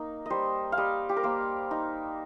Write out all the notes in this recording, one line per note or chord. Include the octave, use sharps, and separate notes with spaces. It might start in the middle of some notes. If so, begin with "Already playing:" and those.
Already playing: A#3 D#4
G3 C5 D#5
F5
G3 D#5
G4
A#4
A#3 C5
D#4